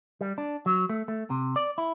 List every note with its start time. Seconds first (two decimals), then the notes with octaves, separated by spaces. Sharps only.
0.21 G3
0.38 D4
0.66 F#3
0.89 A3
1.08 A3
1.30 C3
1.56 D5
1.78 E4